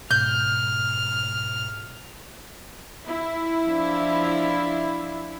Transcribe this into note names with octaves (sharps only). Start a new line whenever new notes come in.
G#2 B2 F6 G6
E4
F3 D4